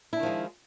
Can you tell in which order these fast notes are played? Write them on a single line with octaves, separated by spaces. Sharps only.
E4 D4 D#3 F3 G#3